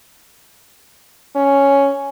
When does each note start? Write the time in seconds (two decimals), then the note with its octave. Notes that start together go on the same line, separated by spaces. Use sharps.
1.36 C#4